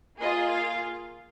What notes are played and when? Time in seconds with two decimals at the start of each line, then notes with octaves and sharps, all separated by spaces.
0.20 A#3 F4 G#4 D#5
0.48 F5